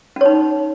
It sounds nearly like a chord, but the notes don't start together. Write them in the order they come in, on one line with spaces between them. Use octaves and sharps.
C#4 C#5 D#4